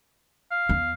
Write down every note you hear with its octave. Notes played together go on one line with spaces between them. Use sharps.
F5
E2